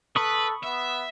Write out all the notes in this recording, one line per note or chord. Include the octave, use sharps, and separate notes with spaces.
A4 B4 B5 C#6 D#6
B3 E5